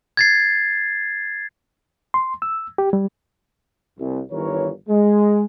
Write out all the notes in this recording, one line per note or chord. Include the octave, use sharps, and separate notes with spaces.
G#6 A6 C7
C6
E6
G4
G3
C2
G1 D#3 E3 A#4 C#5
G#3